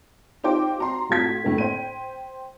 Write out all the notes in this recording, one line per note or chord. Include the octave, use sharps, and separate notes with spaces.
D#4 F4 G4 C5 G5 D6
F#4 A#5 C6
A2 F4 F#4 G#6 B6
A2 D3 A#3
C5 G5 D#7